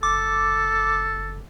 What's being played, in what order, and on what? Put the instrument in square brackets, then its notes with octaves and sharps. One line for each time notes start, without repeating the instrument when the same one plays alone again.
[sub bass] F#1 [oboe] A4 [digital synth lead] D6